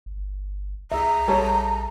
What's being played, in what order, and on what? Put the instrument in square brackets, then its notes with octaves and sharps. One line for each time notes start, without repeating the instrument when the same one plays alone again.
[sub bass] G1
[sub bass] C2 [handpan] G#4 E5 [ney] A#5
[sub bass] A#1 [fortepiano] G3 A4 C#5